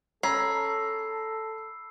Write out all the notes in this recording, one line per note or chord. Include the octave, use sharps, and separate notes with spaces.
C#4 A4 A#5 B5 E6 C7